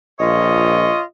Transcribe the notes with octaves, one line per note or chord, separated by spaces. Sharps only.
A#1 F4 C#5 D#5